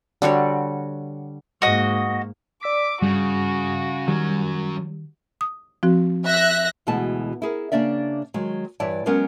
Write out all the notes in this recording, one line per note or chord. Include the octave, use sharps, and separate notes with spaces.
D3 G3 F#4 C#5
G#2 A#3 F#4 D#5
D5 D6 E6 B6
G2 C#3 G3 F#4
D#3 F#3 G3 C#4
D#6
F3 C4 F#4
E5 F#6 A#6
D2 B2 E3 G#3 A5
E4 G#4 A#4
C#3 A#3 D4 D5 E5
D#3 F#3 G#3
G2 E3 E4 C#5 D5 A5
F#3 G#3 B3 C#4 A#4